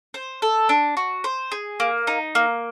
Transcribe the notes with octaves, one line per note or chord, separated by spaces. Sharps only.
C5
A4
D4
F#4
C5
G#4
A#3
D#4
A#3